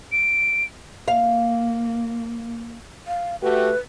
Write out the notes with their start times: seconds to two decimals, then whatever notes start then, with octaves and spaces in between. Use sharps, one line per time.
0.12 D7
1.08 A#3 F5
3.08 F5
3.42 A3 F#4 G4 B4